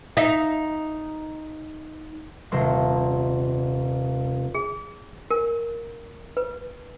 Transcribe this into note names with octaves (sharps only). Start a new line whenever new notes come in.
D#4 E5
D#1 C3 A3 D4 C6 A#6
G#4
A#4
B4